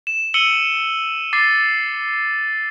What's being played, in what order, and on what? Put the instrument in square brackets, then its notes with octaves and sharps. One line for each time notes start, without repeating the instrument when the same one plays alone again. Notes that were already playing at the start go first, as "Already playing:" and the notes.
[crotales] E7
E6 C#7 D#7 F#7 G7
D6 A6 C7